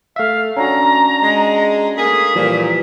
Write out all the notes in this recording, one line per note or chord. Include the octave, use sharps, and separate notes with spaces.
A3 E5 F5
C#4 D4 F#4 A#5
G#3
A3 A#3 G#4 B6
A#2 E3 F3 G3